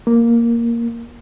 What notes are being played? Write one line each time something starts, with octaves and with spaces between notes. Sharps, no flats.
A#3